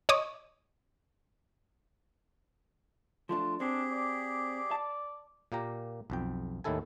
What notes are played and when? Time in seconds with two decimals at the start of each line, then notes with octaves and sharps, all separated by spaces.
0.09 C#5 D#5 D6 D#6
3.29 F3 A3 D4 F4
3.60 C4 D4 G4 G#4
3.91 D5
4.71 A5
5.52 A#2 A#3 G4 A#5
6.10 B1 F2 G5
6.64 D#2 A2 D#3 E4 A4 G#5